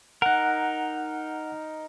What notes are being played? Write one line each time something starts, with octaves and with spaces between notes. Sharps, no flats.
D#4 A#4 F#5 F#6